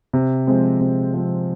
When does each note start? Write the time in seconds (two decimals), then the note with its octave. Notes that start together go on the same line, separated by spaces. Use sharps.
0.13 C3
0.47 F3 G#3 C4
0.81 C3
1.14 F3 G#3 C4